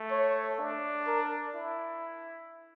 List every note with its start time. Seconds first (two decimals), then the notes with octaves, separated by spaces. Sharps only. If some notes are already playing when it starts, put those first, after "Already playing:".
Already playing: A3
0.11 C#5
0.59 D4
1.07 A#4
1.54 E4